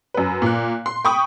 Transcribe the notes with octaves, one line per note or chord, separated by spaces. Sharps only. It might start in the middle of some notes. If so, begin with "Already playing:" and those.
F#2 B4
A#2 F#6
C6
G5 B5 C#6 D#6